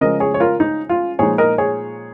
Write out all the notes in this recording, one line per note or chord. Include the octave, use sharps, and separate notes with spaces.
C#3 F3 G#3 A#4 D#5
G#4 C#5
C#5
F4 A#4
D#4
F4
A#2 F3 G#3 D#4 G#4 C#5
A#4 D#5
G#4 C#5